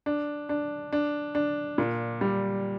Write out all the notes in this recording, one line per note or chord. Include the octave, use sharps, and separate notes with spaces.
D4
D4
D4
D4
A#2
G3